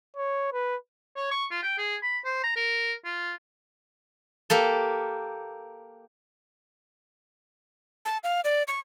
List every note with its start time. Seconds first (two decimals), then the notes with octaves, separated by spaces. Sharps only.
0.17 C#5
0.53 B4
1.16 C#5
1.31 C#6
1.51 F4
1.63 G5
1.78 G#4
2.03 B5
2.24 C5
2.44 A#5
2.56 A#4
3.05 F4
4.50 A#3 G4 A4
8.05 A5
8.24 F5
8.45 D5
8.68 C#6